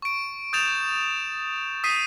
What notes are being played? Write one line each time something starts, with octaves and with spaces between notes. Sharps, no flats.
C#6 D7
D#6 G6 A6 E7 F7
D#6 B6 C7 D#7